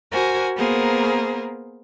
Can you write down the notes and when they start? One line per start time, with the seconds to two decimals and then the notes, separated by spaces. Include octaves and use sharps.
0.11 F#4 A#4 C5 G#5
0.56 A#3 B3 G#4 A#4 C5